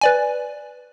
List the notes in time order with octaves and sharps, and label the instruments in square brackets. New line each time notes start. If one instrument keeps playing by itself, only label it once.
[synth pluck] B4 D5 G#5